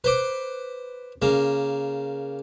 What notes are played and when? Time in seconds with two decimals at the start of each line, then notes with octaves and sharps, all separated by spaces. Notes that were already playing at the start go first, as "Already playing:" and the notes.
0.04 B4 C5 D6
1.22 C#3 A#3